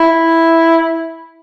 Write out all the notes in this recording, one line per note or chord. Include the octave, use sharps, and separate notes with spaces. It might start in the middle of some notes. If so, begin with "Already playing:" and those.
Already playing: E4